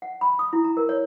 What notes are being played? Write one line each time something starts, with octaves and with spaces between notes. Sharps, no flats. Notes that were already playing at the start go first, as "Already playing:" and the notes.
F#5
B5
D#6
E4
A#5
A#4
C#5